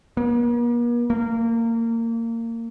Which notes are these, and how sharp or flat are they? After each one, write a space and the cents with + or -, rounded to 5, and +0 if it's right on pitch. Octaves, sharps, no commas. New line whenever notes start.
A#3 +45
A#3 -25